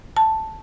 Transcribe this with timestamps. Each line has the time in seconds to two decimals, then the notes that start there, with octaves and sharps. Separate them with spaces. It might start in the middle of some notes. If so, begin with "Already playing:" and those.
0.17 A5